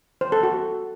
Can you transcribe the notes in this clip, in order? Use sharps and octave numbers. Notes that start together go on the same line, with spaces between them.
C5
A4
F#4